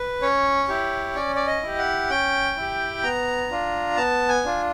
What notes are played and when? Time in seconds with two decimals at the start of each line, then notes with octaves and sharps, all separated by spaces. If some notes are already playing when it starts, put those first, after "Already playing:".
Already playing: B4
0.22 C#4 C#5
0.69 E4 G4
1.16 C#4 D5
1.36 D5
1.47 D#5
1.62 E4 G4
1.78 F#5
2.10 C#4 G5
2.56 E4 G4
3.03 B3 A#5
3.51 D4 F4
3.97 B3 A5
4.29 G#5
4.45 D4 F4